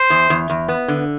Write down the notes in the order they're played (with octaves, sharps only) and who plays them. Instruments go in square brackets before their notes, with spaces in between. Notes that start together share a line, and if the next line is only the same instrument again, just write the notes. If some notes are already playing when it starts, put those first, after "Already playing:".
Already playing: [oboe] C5
[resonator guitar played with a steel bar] E2
E2
E2
B3
D3